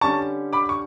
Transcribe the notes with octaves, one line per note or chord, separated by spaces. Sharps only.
D3 G3 C#4 A5 C#6
B5 D6
C#6